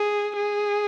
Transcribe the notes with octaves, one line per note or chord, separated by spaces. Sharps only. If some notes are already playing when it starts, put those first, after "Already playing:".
Already playing: G#4
G#4